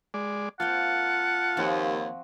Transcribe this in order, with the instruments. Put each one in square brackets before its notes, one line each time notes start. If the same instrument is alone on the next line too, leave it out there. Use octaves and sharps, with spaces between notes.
[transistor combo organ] G#3 D5
[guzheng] A#3 C4 G5 [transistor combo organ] F4 A5 [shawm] F#5
[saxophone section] D#2 [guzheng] F3 C4 F#4